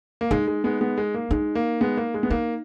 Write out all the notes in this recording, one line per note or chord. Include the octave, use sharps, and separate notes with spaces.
A#3
G#3 D#4
G#3
G#3 B3
G#3 B3
G#3
A#3
G#3 D#4
A#3
G#3 B3
A#3
G#3
B3
A#3 D#4